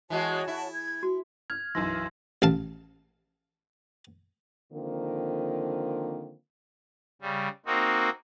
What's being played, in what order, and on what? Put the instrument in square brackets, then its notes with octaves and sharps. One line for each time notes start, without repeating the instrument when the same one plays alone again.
[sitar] E3 G#3 [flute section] F#4 C#5 A5
[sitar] E4
[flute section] G#6
[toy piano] F#4
[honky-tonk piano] F6 [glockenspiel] G#6
[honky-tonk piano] B1 F#2 E3 [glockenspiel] C6 E6 A#6
[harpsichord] A1 F5 A5
[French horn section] D3 D#3 F3 A#3 C4 A#4
[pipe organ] C#3 G3
A#3 C4 D#4 F#4